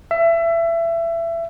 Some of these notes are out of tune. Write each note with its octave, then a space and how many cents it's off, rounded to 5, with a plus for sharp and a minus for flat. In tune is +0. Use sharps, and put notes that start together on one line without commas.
E5 +25